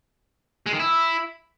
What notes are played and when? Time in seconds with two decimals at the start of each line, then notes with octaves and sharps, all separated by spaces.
0.66 G#3
0.73 D#3
0.79 E4